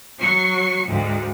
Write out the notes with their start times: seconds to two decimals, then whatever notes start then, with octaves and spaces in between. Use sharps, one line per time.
0.19 F#3 C#6 C7
0.87 D2 G#2